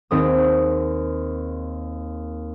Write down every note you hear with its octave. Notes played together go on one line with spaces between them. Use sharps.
D#2 C4 G#4 D#6